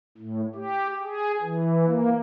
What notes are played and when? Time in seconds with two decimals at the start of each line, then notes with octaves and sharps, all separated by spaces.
0.18 A2
0.55 G4
1.04 G#4
1.41 E3
1.85 A#3